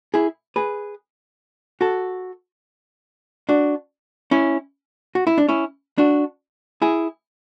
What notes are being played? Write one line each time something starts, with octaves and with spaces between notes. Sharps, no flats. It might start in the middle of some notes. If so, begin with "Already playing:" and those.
E4 G#4
G#4 B4
F#4 A4
D4 F#4
C#4 E4
F#4
E4
D4
C#4 E4
D4 F#4
E4 G#4